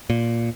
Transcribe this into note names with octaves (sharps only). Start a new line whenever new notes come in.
A#2